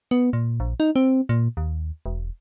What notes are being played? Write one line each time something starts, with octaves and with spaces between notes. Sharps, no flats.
B3
A#2
A#1
D#4
C4
A#2
D#2
E1